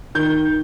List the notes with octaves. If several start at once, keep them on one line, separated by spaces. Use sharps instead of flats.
D#3 G6